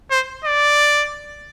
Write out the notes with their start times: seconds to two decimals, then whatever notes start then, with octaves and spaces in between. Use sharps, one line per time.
0.11 C5
0.45 D5